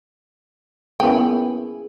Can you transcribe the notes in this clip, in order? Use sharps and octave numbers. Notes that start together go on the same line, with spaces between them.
A#3 B3 C#4 E4 G#4 G5